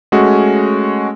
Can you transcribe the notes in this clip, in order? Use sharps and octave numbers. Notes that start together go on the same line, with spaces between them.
G#3 A3 C#4 F#4 G#4